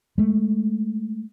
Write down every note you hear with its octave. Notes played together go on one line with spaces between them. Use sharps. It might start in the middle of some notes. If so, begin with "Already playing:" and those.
G#3 A3